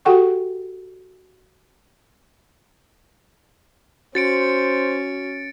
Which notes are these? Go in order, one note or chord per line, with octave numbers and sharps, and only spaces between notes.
F#4 G4 A4 F#5 G5 C#6
C#4 F#4 C5 A6 C#7 D7